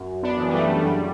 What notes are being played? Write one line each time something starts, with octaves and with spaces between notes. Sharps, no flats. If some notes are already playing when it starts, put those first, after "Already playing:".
Already playing: F#2
B3 D4
C#3 E3
G3
A3
A3
F#2 G3